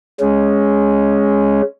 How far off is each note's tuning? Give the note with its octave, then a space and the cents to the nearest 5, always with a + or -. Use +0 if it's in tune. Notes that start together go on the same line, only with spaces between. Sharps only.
G#3 +0 C#4 +0